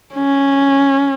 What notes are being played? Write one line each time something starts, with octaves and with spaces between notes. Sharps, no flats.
C#4